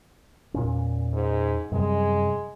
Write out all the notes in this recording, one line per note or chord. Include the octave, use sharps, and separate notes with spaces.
E2 A#2 C#4
G#2
F#2 C3 G3 G#3